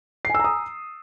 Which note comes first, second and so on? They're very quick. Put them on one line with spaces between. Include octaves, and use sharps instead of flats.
C7 G#5 E6 A#5 D#6